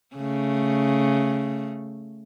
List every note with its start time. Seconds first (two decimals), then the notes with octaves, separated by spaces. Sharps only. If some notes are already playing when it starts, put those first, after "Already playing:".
0.16 C#3 A3